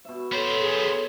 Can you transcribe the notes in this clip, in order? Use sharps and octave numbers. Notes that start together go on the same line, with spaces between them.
B2 E5
B3 A4 C5 C#5
G#4